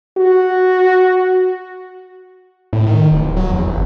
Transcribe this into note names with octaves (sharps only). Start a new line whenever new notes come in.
F#4
A2
D#3
D1
F#3
E2
G1